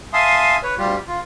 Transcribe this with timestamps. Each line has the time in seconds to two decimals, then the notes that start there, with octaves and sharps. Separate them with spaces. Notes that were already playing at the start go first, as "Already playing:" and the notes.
0.13 E5 F5 G#5 A5 C6 D#6
0.63 B4 C#5
0.78 D2 G3 F4 G4
1.08 F4